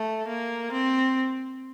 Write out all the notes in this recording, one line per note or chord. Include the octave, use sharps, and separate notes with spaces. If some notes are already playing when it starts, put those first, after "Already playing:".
Already playing: A3
A#3
C4